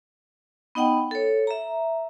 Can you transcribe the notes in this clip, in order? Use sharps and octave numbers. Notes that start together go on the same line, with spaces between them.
B3 D#4 D#5 F#5 G5
A4 C#5
E5 A#5